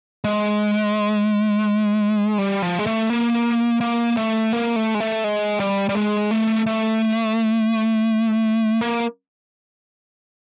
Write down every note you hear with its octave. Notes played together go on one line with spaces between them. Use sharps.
G#3
G3
F3
G#3
A3
A#3
A#3
A3
A#3
A3
G#3
A3
G#3
G3
G3
G#3
A3
A3
A#3